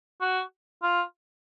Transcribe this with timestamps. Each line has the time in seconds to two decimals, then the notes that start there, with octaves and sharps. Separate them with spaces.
0.21 F#4
0.83 F4